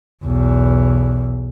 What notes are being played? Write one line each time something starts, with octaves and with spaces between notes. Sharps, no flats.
B1 E2